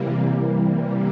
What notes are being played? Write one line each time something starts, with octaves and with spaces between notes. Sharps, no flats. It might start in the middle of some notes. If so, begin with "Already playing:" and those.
Already playing: C3 E3 G3 A#3